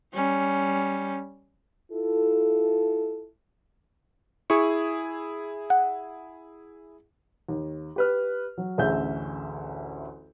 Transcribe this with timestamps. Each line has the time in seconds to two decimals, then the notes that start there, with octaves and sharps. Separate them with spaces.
0.14 G3 C#4
1.92 E4 F4 A4
4.50 E4 G#4 C#6
5.70 F#5
7.49 D#2
7.96 G4 B4 F6
8.58 F#3
8.78 A1 D2 C#4 G#4 E5 G6